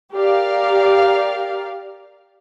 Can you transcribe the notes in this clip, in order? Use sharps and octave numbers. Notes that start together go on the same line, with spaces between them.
G4 A#4 D5 F5